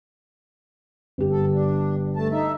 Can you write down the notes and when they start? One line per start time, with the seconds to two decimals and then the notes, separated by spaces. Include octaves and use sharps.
1.18 G1 G4
1.31 A4
1.52 D4
2.16 A3 A5
2.31 D#4 E5